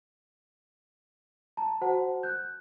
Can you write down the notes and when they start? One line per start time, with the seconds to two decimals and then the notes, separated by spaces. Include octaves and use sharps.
1.57 A5 A#5
1.81 F#4 C5 F#5 A5
2.23 F#6 G6